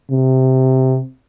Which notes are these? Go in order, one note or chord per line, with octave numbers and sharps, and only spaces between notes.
C3